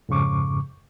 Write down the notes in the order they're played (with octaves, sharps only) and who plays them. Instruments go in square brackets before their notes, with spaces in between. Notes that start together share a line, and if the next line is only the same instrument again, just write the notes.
[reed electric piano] F2 G#2 C#3 C#6 D6